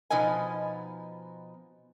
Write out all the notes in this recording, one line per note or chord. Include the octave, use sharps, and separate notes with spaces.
B2 F3 B3 D#4 D#5 G#5